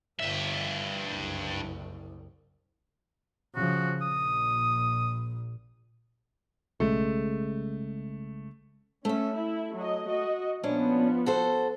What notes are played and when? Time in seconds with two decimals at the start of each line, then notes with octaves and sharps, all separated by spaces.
0.20 G1 G2 E5
1.09 F#1 C2
3.56 C#3 F3 F#4
4.02 A#1 A#2 D#6
6.80 B1 C#3 G#3 A3
9.05 A3 C#4 E5
9.37 E4
9.76 F#3 D#5
10.08 F#4 D#5
10.63 A#2 F3 B3 C#4 D4
11.26 F#4 A4 C5